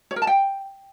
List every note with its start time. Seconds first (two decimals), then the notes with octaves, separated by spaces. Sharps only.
0.11 C#5
0.16 A#4
0.22 A5
0.27 G5